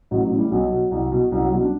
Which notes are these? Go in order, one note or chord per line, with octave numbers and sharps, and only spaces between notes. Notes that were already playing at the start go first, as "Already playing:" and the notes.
A1 F#3
F#3
A2 E3
G3
B1 F#3
B2
C2
B2
C2 F#3
F#3
B2 G3
D4